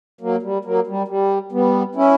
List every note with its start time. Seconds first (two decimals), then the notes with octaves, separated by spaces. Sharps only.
0.21 F#3 A#3
0.43 G3
0.65 F#3 A#3
0.87 G3
1.08 G3
1.52 G3 B3
1.95 C#4 E4